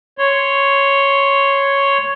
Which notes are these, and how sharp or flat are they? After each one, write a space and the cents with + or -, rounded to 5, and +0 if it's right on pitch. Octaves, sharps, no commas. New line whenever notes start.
C#5 +0 C6 +0